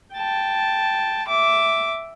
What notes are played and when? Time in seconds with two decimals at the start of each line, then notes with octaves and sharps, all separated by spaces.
0.14 G5 A5
1.28 E5 D6